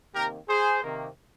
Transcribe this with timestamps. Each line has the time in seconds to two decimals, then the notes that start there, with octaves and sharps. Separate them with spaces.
0.14 C3 D#3 A#3 G4 A#4
0.49 G#4 C5
0.83 C3 D#3 A#3